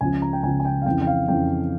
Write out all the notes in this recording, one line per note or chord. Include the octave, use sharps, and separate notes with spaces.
C#2 C#3 F3 G#5
A#5
G5
C#2 C#3 F3 G#5
G#5
G5
F5
F2 C#3 E3 G5
G5
F5
F2 C#3 E3 G5